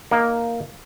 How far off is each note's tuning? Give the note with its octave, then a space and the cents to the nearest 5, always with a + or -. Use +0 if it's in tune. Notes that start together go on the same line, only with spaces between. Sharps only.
A#3 +0 D#4 +0